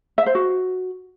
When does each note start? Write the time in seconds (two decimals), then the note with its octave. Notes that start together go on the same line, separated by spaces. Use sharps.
0.18 E5
0.26 C5
0.35 F#4